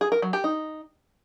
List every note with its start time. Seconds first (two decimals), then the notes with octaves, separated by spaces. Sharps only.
0.01 G#4
0.12 A#4
0.22 F#3
0.33 G4
0.44 D#4